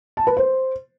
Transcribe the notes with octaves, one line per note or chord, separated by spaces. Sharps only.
A5
B4
C5